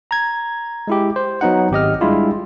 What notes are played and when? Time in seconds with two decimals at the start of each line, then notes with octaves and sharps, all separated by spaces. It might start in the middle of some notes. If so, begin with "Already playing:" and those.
0.11 A#5 G#6
0.87 G#3 E4 G4
1.16 C5
1.41 F#3 B3 D#4 F#5
1.71 G#1 G4 D#5 F6
2.01 G3 G#3 D4 E4 F4 G4